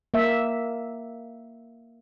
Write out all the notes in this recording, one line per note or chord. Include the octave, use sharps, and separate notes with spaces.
A#3 E5